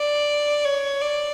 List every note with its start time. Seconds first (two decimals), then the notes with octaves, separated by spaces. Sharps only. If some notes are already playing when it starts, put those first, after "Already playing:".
Already playing: D5
0.65 C#5
1.01 D5